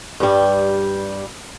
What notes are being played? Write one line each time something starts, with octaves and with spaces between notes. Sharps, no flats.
G2 G3